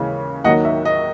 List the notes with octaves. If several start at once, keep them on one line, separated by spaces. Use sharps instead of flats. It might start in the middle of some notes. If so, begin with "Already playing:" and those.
Already playing: D#2 C#3 E3 G#3
D#2 D#3 F#3 D#5 F#5
E5
D#5